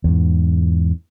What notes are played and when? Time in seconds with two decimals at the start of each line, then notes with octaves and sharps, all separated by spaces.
0.04 E2 G#2